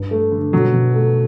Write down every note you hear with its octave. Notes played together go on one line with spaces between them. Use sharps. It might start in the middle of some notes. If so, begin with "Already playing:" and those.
Already playing: G2
A3
D3
B2 F#3
B2
A3